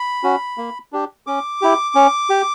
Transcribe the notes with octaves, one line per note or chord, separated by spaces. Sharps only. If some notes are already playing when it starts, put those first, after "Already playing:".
Already playing: B5
C#4 F#4
A#3
D4 G4
C#4 D6
E4 G4
C#4
G4